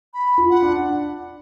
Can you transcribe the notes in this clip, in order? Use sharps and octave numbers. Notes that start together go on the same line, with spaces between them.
B5
F4
F#5
D4